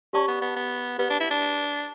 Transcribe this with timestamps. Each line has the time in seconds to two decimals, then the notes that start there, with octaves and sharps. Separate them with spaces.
0.13 C#4 G4 D5 A5 C#6
0.28 B3
0.41 B3
0.56 B3
0.98 B3 G4 B4 D5
1.10 D4
1.20 E4
1.30 D4